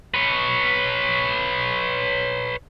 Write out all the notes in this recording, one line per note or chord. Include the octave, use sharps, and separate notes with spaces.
B4 C#5